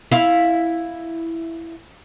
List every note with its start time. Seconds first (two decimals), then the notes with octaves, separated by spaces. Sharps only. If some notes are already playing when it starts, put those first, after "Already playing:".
0.12 E4 F5